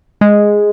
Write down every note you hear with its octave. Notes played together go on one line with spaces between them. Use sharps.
G#3